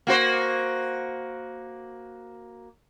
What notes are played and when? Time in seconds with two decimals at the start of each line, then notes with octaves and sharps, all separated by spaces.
0.07 A#3 F#4 C5